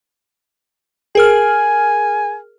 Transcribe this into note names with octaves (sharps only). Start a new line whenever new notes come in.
G#4 A#4 G#5 F6